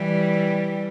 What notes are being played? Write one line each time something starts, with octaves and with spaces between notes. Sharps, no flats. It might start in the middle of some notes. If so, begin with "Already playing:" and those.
Already playing: E3 G3